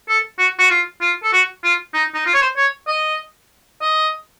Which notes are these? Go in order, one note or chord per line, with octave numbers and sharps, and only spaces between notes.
A4
F#4
F#4
F4
F4
A4
F#4
F4
D#4
D#4
F4
C#5
C5
C#5
D#5
D#5